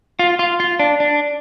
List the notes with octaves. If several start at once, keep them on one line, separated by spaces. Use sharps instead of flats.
F4
F4
F4
D4
D4